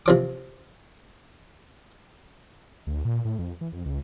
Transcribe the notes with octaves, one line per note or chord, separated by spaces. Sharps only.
C3 F3 D6
D2
A#2
A2
F2
E3
F2
C#2